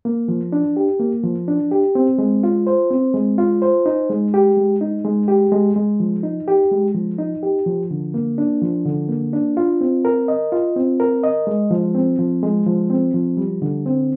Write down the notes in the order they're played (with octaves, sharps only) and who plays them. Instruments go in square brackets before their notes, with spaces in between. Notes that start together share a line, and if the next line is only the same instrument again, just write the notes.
[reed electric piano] A#3
F3
D4
G4
A#3
F3
D4
G4
C4
G#3
F4
C5
C4
G#3
F4
C5
D#4
G#3
G4
G#3
D#4
G#3
G4
G#3
G#3
F3
D#4
G4
G#3
F3
D#4
G4
F3
D3
A#3
D4
F3
D3
A#3
D4
F4
C4
A#4
D#5
F4
C4
A#4
D#5
G#3
F3
C4
F3
G#3
F3
C4
F3
G3
D3
C4